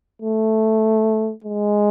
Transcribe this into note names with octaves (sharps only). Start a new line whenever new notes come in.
A3
G#3